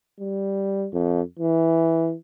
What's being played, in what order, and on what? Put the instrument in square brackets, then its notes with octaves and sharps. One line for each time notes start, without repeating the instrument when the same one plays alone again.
[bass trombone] G3
F2
E3